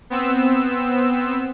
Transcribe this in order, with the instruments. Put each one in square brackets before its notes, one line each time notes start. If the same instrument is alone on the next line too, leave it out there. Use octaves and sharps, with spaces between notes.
[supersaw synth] B3 C4 E6